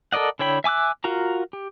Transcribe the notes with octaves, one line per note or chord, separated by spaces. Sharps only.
A4 A#4 D5 D#5 F#5
D3 E4 C#5 G5 B5
E5 G#5 D6 E6 F#6
F4 F#4 A#4 A#5
G4